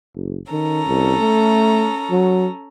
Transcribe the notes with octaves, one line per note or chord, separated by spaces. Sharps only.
F#1
D#3 C#4 A4 A#5
C2
A3
F#3